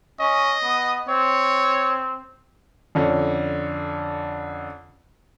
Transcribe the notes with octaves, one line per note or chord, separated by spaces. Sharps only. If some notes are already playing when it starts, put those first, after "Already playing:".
C#4 D#5
B3
C4 C#5
F2 D3 C#4